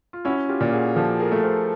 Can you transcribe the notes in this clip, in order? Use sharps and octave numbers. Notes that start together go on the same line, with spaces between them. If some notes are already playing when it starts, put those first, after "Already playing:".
F4
C#4 E4 F#4
F4 G4
A#2
F#4 G#4
F3 G4 A4
G#4 A#4
A3
A#4 C5